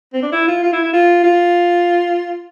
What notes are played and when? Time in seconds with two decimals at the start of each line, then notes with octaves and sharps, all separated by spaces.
0.13 C4
0.22 D4
0.32 E4
0.48 F4
0.63 F4
0.73 E4
0.83 E4
0.93 F4
1.23 F4